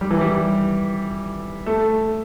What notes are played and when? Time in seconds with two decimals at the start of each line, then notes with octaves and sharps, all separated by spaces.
0.01 G3
0.11 E3
0.21 G3
1.66 A3